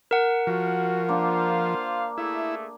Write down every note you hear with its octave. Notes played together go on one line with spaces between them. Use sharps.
A#4 F#5
F3 F#4
A#3 D4 F4 C5 F5
A3 E4 G#4 E5